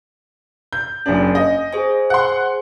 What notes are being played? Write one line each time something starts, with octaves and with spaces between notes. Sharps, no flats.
G6
F#1 C#4 D4 G#5
D#5
G#4 C5 G#5
F#5 C6